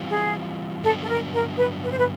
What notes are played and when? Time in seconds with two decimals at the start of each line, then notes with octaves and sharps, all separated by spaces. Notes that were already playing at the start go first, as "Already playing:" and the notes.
Already playing: E3 G3 C4 F4
0.10 G#4
0.83 G2 D3 F#3 B3 D4 A4
1.02 A4
1.09 A#4
1.34 A#4
1.57 B4
1.83 B4
1.90 C5
1.98 B4